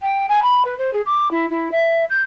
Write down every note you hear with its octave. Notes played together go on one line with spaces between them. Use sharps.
G5
G#5
B5
B4
C5
G#4
D6
E4
E4
E5
G6